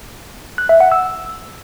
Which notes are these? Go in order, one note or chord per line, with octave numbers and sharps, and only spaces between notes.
F#6
E5
F#5
E6